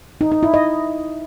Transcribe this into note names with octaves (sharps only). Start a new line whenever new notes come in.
D#4
D#4
E4
D#5